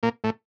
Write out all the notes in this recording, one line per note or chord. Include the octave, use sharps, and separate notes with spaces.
A#2 A#3
A2 A3